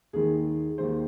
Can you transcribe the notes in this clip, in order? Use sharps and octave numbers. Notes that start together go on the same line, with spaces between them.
D#2 D#3 G#3 G#4
D#2 D#3 G#3 C5